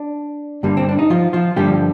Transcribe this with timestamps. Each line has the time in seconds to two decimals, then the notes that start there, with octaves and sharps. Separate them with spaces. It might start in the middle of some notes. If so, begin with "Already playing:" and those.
Already playing: D4
0.63 G2 D3 G3 A#3
0.77 C4
0.89 D4
0.99 D#4
1.10 F3 F4
1.33 F3 F4
1.56 G2 D3 F3 G3 A#3 G4